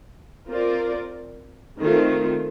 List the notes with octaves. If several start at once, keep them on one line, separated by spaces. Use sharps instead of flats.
C4 F4 A#4 D5
D#3 A3 C4 F4